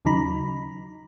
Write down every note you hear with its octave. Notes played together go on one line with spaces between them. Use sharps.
D#2 C#3 F#3 D#4 A#5 B5